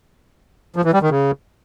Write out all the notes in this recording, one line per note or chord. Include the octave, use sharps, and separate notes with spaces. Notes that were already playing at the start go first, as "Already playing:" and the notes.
F3
E3
G3
D#3
C#3